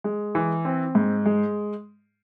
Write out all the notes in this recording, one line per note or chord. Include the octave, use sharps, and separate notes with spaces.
G#3
E3
C4
G#2
G#3